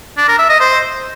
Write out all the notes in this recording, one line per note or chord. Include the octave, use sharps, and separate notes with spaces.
D4
A#4
E5
D#5
C5